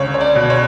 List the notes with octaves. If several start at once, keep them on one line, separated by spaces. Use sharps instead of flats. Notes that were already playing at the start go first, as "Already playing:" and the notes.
Already playing: C#2 D3 C#5
C#5
D5
B2
C#5